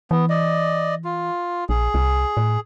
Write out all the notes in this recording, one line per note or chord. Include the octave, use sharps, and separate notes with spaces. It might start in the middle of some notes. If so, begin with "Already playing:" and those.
E3 B3
D5 D#5
F4
A#1 G#4
C2
A2